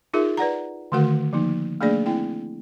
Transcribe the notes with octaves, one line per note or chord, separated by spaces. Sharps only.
D#4 F4 G#4 A#4 E5
B4 D5 F#5 A#5
D3 D#3 A3 F#4 A#4 F#5
F3 A#3 D#4
A3 A#3 D4 G#4 D5
C4 E4 G5